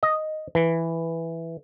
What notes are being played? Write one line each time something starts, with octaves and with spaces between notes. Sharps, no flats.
D#5
E3